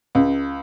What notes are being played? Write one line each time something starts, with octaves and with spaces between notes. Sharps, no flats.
C#2